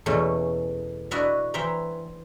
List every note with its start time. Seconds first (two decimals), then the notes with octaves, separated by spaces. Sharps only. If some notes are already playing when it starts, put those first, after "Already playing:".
0.06 E2 B2 A3 C#4
1.11 D4 E4 F#4 D#5 E5
1.54 E3 C5 E5 G5 A#5